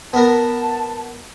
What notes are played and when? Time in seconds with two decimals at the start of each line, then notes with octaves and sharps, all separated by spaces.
0.13 B3 A#4 A5